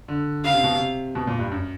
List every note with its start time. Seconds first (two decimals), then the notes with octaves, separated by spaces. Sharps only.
0.08 D3
0.44 C#3 F5
0.54 C3
0.64 B2
0.74 C3
1.15 B2
1.27 A#2
1.39 G2
1.51 F#2